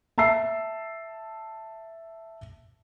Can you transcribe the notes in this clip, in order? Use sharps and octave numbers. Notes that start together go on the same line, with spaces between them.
E5 A5 E6 C7